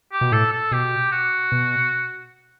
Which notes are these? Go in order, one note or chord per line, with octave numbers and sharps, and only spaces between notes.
G4
B2
A2 A4
A4
B2 G4
F#4
B2